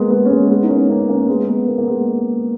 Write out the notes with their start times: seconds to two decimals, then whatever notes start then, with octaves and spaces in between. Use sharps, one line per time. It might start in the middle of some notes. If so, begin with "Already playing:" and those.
Already playing: G#3 A#3 B3
0.10 G#3 B3
0.25 C#4
0.30 G#3 B3
0.50 G#3 B3
0.63 D#4
0.69 A#3 C#4
0.89 A#3 C#4
1.09 A#3 C#4
1.28 G#3 B3
1.48 G#3 B3
1.68 A#3
1.78 A#3
1.88 G#3 B3